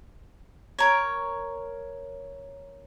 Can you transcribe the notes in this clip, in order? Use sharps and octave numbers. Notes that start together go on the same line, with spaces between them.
A#4 C#5